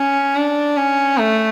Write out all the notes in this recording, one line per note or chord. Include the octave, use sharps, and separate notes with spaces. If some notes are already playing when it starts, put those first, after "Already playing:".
Already playing: C#4
D4
C#4
A3